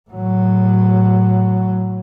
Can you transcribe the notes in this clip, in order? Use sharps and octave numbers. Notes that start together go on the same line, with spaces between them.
A2 F#3